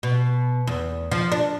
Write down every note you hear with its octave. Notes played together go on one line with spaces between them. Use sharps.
B2
E2
F3
D4